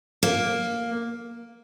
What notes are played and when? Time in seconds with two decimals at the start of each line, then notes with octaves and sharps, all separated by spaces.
0.23 A#3